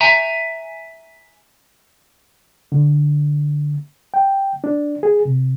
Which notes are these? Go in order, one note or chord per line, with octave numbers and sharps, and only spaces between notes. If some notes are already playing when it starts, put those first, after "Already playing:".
E5 G#5 A#5
D3
G5
D4
G#4
C3